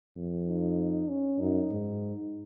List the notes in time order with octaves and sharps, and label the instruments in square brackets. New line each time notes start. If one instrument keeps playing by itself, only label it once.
[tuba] F2
[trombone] D#4
C#4
[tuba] F#2 [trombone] D#4
[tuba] G#2